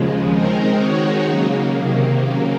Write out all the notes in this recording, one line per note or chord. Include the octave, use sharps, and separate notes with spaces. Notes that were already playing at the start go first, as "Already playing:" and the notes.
Already playing: D#2 C#3 F3 G#3
D#3 G#3 C4 D#4 A#4
D#3 G#3 D#4 F#4 C#5
C#3 F#3 A#3
C3 D#3 A#3
C#3 F#3 A#3